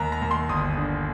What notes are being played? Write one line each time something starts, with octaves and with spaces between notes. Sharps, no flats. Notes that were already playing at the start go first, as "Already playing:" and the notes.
Already playing: D#2 A#5
A#5
D#2
C6
G1 D#6
D3